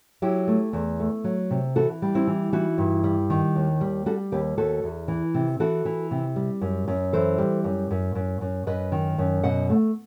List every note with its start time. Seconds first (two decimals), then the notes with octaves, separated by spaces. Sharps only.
0.22 F#3 E4 G4
0.48 A3
0.73 E2
1.00 A3
1.24 F#3
1.51 C3
1.75 E3 F#4 A4
2.02 G3
2.15 C4 E4
2.27 E3
2.53 E3 D#4 F#4
2.78 G2
3.04 G3
3.30 D#3
3.56 D#2
3.81 G3
4.06 G3 F#4 A4
4.32 D#2 G4 B4
4.58 D#2 F#4 A4
4.84 E2
5.08 E3
5.34 C3
5.60 E3 F#4 A4
5.85 E3
6.11 C3
6.36 G3
6.61 F#2
6.88 F#2
7.13 E3 A4 C5
7.38 G3
7.64 F#2
7.91 F#2
8.15 F#2
8.41 F#2
8.67 F#2 B4 D#5
8.92 D#3
9.18 F#2
9.43 B2 D#5 F#5
9.70 A3